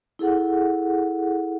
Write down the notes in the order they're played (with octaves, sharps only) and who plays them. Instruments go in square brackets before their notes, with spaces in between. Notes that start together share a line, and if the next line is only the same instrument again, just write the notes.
[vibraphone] E4 G#4 A4 F#5